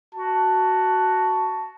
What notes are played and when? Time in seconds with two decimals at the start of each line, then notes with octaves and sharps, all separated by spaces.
0.15 F#4 A5